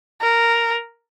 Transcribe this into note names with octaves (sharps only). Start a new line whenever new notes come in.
A#4